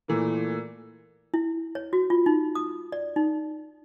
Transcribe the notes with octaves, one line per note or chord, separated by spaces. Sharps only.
A#2 E3 A3 A#3
E4
C#5
F#4
F4
D#4
D#6
D5
D#4